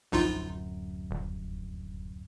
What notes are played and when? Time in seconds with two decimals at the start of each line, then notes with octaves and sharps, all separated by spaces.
0.12 D1 A#1 F#2 D#4 F4
1.11 D#1